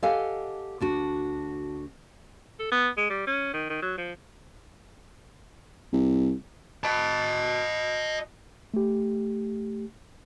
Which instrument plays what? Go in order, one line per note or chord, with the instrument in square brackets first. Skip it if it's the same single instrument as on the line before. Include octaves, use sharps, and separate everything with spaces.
[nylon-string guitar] G4 A4 D#5 F5 F#5 G#5
D2 D4 F#4
[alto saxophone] A4
B3
G#3
G3
C#4
D#3
D#3
F#3
F3
[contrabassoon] C2
[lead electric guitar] D#5 A5
[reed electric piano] A3 G4